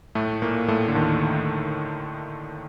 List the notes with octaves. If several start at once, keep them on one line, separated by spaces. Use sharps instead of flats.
A2 A3
A#2 A#3
A2 A3
D3
D#2 D#3